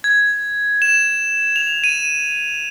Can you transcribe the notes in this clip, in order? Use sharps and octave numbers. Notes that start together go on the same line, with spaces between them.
G#6
E7
F7
D#7